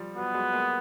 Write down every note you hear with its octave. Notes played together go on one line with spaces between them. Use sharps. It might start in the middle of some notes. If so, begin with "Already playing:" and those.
Already playing: F3 G3
F#3 B3
F#3 G#3
G#3 A#3